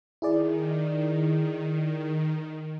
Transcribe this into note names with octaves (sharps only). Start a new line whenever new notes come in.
D#3 E4 G#4 D5